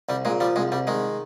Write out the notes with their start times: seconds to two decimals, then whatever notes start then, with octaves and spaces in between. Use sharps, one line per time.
0.09 C2 G3
0.25 A#2 G#3
0.40 F3 G3
0.56 C2 G#3
0.72 C2 G3
0.87 D#3 G#3